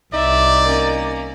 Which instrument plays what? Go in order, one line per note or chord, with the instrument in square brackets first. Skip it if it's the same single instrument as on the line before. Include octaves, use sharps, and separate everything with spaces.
[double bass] C2 [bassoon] D#4 [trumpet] D5 [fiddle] E5
[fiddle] A#3 C#4